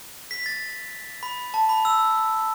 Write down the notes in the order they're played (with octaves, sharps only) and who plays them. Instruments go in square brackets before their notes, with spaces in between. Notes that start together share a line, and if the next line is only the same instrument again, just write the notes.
[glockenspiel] B6
A6
B5
A5
B5
E6